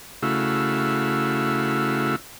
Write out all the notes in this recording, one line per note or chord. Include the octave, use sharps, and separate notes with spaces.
C#3 A3 E4 F#4 F5 E6